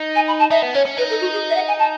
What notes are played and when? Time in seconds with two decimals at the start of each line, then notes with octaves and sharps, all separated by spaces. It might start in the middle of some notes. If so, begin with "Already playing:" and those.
Already playing: D#4
0.15 G#5
0.28 B5
0.39 A5
0.51 D#4 E5
0.62 B3
0.74 C#4 C#5
0.86 C#4
0.97 D#4 B4
1.10 A4
1.21 F#4
1.33 G#4
1.50 E5
1.56 F#5
1.68 G#5
1.79 A5